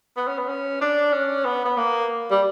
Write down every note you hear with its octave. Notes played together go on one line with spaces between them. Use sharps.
B3
C#4
B3
C#4
D4
C#4
B3
B3
A#3
G3